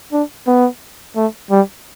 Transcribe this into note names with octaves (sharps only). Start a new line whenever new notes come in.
D4
B3
A3
G3